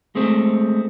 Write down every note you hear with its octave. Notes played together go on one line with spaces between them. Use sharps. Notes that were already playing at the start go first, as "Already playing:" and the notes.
G#3 A3 C4